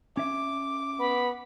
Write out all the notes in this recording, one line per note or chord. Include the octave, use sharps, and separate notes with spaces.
C#4 E5 D6
B3 B5